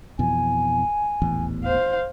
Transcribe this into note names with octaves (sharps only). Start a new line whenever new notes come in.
F2 B2 E3 G#5
D#1 A1 E2
C5 F5